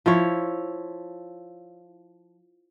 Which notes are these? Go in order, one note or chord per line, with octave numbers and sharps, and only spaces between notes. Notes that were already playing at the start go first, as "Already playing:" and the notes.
F3 E4 C#5